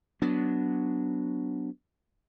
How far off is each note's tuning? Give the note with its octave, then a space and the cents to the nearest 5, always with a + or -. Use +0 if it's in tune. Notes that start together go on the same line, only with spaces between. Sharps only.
F#3 +0 B3 +0 D4 -10